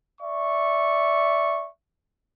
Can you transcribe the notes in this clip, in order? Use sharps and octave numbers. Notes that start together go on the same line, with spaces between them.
D5 E5 C#6